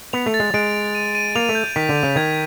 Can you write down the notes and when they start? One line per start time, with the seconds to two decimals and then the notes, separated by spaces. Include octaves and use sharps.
0.13 B3 F7
0.26 A3
0.34 A6
0.40 G#3
0.54 G#3 D7
0.74 D7
0.95 D#7
1.15 D#7
1.35 A#3 F7
1.49 A3
1.55 G6
1.76 D#3 B6
1.89 D3
1.96 D#7
2.03 C#3
2.16 D#3 G#6